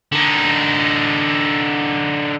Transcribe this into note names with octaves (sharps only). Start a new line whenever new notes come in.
D3 D#4